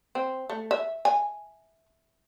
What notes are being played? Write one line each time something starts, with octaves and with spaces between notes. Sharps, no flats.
C4
A3
E5
G#5